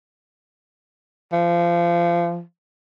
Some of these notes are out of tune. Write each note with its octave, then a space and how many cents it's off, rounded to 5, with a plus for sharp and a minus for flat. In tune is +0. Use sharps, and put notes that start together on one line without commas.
F3 -25